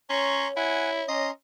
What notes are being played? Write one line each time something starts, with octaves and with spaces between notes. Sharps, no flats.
C#4 C#5 A#5 C6 C#6
E4 F#5 G#5
C#4 D#5 A#5 C6